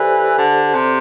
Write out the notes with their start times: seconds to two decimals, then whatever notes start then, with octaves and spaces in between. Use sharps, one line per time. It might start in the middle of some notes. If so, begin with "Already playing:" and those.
Already playing: E3 G4 A4 C5 D5
0.38 D3
0.74 C3